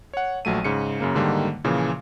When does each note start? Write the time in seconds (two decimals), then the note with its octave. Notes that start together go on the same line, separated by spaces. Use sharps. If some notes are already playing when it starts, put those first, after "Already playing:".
0.13 C#5 F#5
0.45 A#1 F#3 A3 D#7
0.65 G#2 C#3 C#7
1.00 F#2 C#3 A#3
1.15 G#2 D3 D#3 G3 A#3
1.64 A#2 C#3 E3 F3